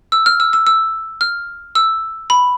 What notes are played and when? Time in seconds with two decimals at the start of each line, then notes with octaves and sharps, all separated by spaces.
0.12 E6
0.26 F6
0.40 E6
0.53 E6
0.67 E6
1.21 F6
1.75 E6
2.30 B5